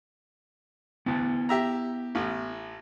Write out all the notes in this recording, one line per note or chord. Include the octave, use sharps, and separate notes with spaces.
D2 B3 E4 A5
G4 E5 A#5
A1 A2